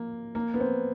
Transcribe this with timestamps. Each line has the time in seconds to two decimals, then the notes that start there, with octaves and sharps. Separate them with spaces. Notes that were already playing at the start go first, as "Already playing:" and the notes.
Already playing: A#3
0.35 A#3
0.54 B3
0.60 C4